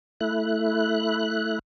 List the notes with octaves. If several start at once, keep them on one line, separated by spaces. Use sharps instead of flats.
A3 E4 F#6